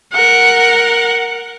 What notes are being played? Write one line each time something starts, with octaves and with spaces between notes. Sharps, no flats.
A#4 F#5